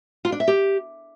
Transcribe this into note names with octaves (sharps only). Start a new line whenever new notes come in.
F4
D4
E5
G4